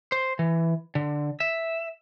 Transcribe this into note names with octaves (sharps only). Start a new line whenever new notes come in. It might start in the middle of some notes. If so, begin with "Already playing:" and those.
C5
E3
D3
E5